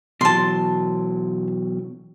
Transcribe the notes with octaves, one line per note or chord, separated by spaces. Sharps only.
B2 E3 F#3 A5 C6